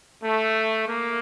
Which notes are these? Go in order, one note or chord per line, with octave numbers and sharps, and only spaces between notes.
A3
A#3